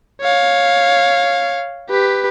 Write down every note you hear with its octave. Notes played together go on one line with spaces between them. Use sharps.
C#5 F5
G4 B4